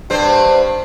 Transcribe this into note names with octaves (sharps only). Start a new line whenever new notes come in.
G2 C4 C5